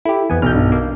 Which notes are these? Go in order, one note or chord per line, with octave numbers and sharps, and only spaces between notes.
E4 G4 A4 E5
F2 E3 B3 G#5
B1 F6 G6
G2 D4
A#3